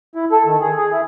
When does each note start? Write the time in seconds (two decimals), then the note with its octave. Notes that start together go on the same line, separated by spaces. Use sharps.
0.15 E4
0.32 A4
0.46 D#3
0.61 G#4
0.77 G#4
0.92 E4